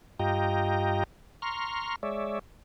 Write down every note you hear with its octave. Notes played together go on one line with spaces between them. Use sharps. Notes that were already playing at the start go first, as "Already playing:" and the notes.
G2 F4 G4 D#5 G5 A#5
A#5 C6 C#6 F6
G#3 C#5 D5 E5